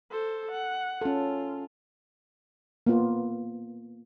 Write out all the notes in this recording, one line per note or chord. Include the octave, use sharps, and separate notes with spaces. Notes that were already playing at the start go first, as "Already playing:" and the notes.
A4 C5
F#5
C#4 F4 A4
A#3 B3 F4